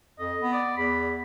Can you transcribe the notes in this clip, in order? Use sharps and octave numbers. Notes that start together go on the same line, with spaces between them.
F2 D#5
B3
D5
E2 B5